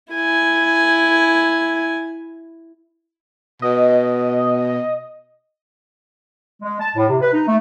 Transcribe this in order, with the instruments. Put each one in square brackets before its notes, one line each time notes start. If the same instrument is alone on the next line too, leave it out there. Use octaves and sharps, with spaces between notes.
[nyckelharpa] E4 G#5
[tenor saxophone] B2 [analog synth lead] D#5
[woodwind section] G#3
A5
A2
C3
B4
D#4
A3